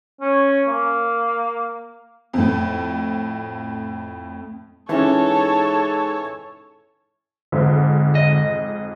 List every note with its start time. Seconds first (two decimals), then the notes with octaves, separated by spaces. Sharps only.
0.21 C#4
0.68 A#3
2.33 F2 A2
4.89 G#2 E3 C#4 A4 C#5 A5
7.52 F2 G#2 D3
8.15 D#5